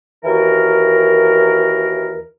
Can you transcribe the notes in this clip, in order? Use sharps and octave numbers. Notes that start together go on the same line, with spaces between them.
D#2 E3 F#4 A#4